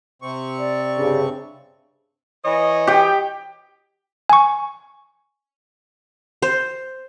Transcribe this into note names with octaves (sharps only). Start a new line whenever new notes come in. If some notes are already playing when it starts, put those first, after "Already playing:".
C3 C4 C#6
D5
G2 C#3
E3 C#5 D#5
G4 G5
G#5 C#6
C5